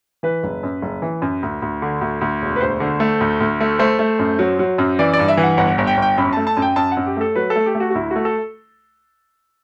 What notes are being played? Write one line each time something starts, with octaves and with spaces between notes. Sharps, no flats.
E3 B4
F#1
F#2
F#1
E3
F#2
D2
D2
D3
D2
D2
E1
B4
D2 C5
D3
A3
D2
D2
A3
A3 C5
A3
F#2
F#3
F#3
F#2
E3 D5
D5
G2
E5
E3
F#5
G1 F#5
G1
G5
G1
G5
F#2 B5
A3 A5
A5
F#2
G5
F#2 A5
F#5
F#2
G4
A3 A4
F#3 B4
A4
A3
G4
A3
F#4
F#4
D2 E4
A3 F#4
A4